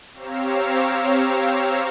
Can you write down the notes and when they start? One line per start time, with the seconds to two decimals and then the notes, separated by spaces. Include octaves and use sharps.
0.13 C4 G4 C#5 F5 A#5 E6